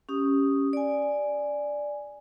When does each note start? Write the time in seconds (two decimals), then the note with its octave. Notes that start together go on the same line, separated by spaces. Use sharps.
0.09 C#4 G4 D#6
0.73 D5 G#5